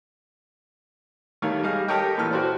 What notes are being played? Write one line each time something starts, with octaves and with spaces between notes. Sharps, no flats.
D#3 G3 A3 C#5 F5
G3 G#4 D#5 F5
G4 A4 A#4 C#5 D#5 G5
A#2 E3 A4 F6
F#4 C5 D5